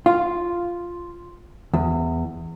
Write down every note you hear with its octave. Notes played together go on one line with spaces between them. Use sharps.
F4
E2